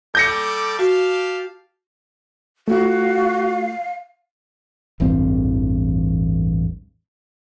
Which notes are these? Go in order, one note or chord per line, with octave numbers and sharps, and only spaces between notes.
G3 A4 D6 G6 A#6 C#7
F#4 G4 F5 A5
A3 F4 F#4 F5
A1 E2 G2 C4